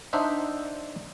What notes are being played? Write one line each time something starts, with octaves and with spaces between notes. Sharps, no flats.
D4 D#4 C5 E5 F#5